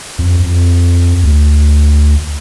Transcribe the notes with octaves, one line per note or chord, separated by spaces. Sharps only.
F2
F2
D2